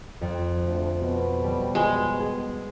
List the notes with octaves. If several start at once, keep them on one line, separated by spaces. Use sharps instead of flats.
F2
D2
B2
G3
G#3
G#4